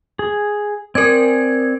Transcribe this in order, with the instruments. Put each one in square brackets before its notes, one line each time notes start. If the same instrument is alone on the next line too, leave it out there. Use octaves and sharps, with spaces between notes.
[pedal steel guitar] G#4
[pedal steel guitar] C4 D5 G#5 [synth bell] A#4 G#6